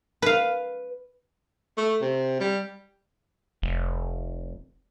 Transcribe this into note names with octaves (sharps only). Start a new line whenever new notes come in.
B4 F5
A3
C3
G3
F1